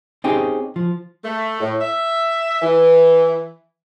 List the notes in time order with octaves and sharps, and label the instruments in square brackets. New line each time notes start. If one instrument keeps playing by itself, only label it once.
[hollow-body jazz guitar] C4 C#4 D#4 G4 G#4
F3
[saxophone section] A3
A2
E5
E3